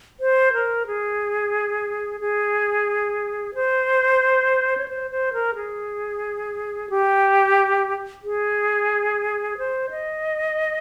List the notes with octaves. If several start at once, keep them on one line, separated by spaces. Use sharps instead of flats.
C5
A#4
G#4
G#4
C5
C#5
C5
C5
A#4
G#4
G4
G#4
C5
D#5